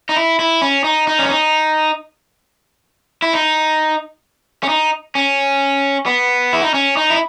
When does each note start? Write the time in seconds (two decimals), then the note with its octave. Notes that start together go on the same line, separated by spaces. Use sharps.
0.09 D#4
0.16 E4
0.39 E4
0.62 C#4
0.84 D#4
1.07 D#4
1.19 C#4
1.29 D#4
3.22 E4
3.33 D#4
4.63 C#4
4.69 D#4
5.15 C#4
6.06 B3
6.53 E4
6.63 D#4
6.74 C#4
6.97 D#4
7.10 E4